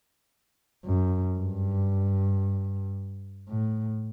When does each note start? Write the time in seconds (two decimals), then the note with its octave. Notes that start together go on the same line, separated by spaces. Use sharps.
0.86 F#2
1.38 G2
3.48 A2